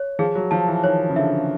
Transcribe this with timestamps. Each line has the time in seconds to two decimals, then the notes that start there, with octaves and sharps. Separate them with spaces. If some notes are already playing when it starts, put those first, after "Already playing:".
Already playing: C#5
0.19 F3 G#4
0.35 F#3
0.51 F3 A5
0.68 E3
0.84 D#3 C#5
1.10 C#3
1.16 D3 E5